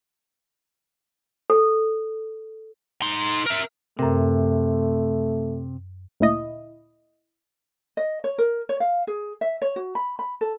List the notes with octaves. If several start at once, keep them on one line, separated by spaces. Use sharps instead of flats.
A4
D#4 C6
A#4 E5
F#2 C3 A3 A#4
D2 A#2 E4 D#5
D#5
C#5
A#4
C#5
F5
G#4
E5
C#5
F#4
B5
B5
A4